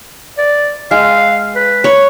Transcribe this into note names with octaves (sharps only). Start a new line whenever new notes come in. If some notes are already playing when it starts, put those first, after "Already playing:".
D5
G#3 F5
B4
C#5 B5